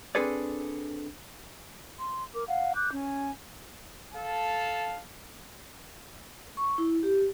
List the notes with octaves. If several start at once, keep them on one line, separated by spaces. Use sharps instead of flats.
C4 D4 G#4 A4 B4 D5
C6
A#4 D6
F5 F#5
D6 F#6 G6
C#4 G#5
A4 F5 A5
C#6
E4
G4